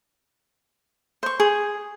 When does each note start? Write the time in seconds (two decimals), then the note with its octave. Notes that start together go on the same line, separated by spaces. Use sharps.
1.23 C5 C#6
1.40 G#4